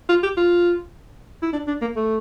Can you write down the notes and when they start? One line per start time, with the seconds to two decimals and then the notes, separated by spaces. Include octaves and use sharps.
0.09 F4
0.23 G4
0.37 F4
1.43 E4
1.53 D4
1.68 D4
1.81 A#3
1.96 A3